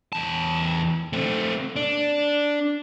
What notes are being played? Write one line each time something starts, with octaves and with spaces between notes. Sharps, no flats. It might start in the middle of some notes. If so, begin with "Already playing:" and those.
E2 A5
A3 C4
D4